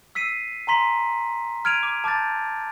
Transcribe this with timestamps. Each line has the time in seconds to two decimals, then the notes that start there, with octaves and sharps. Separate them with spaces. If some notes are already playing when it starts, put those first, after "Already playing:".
0.15 E6 B6 C7 D#7
0.67 G#5 A#5 C6 B6 F#7
1.65 F6 G#6 D7 D#7 F7
1.83 D6
2.04 A5 D6 F6 G6 A6